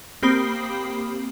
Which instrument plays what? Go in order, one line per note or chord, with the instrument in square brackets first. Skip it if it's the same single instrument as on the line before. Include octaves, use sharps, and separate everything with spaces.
[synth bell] A#3 C4 G4 B5 D#6 C7